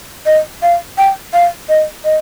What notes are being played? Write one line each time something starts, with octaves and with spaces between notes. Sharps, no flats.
D#5
F5
G5
F5
D#5
D#5